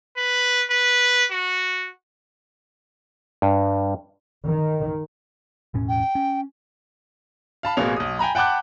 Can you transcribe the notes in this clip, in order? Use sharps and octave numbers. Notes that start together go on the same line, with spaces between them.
B4
B4
F#4
G2
D#3
E1 A2 C#4
G5
C#4
F5 A5 B5
A1 B2 A#3 G#4 C#5 F7
B1 D#6
G5 G#5 A#5 B5
F#5 G5 A5 B5 D6 F#6